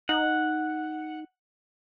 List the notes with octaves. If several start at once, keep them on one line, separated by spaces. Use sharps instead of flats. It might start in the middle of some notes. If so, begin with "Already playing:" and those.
D#4 F#5